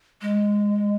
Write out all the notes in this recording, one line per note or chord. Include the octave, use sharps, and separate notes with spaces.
G#3